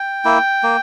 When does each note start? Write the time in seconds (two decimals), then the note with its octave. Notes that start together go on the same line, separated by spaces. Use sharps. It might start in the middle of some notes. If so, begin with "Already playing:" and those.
Already playing: G5
0.25 A#3 E4
0.63 A#3